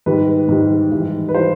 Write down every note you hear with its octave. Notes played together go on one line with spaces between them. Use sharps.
G#2 D#3 G3 B4
G#2 D#3 G3
G#2 E3 G3
B4
E3 G3 C5